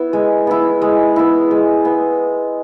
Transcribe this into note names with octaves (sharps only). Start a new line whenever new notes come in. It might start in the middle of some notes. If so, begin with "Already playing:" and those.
Already playing: B3 E4
G#3
B3 E4
G#3
B3 E4
G#3
B3